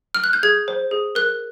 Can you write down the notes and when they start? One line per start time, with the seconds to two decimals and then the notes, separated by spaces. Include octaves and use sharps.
0.15 F6
0.24 F#6
0.33 G6
0.43 G#4 G#6
0.68 C5
0.91 G#4
1.15 A#4 F#6